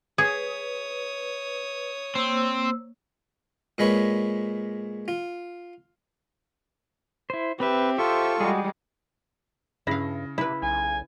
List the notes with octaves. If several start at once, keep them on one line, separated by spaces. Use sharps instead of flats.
G#4 B4 C#5 D#6
A#3 C4 C5 E6
A#2 G#3 B4 C#5
F4
E4 C5
C4 G4 B4 E5
F4 A4 C5 E5 C#6
G3 G#3 F#4 G#4
G2 C#3 E4 F5 A#6
C3 E4 B4
B1 G#5